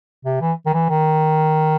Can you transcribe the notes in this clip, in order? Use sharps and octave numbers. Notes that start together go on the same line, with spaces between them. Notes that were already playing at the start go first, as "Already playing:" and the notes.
C3
E3
D#3
E3
D#3